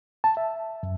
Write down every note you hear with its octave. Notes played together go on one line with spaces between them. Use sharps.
A5
E5
F#2